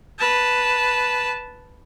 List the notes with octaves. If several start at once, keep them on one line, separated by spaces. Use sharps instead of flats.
B4 A5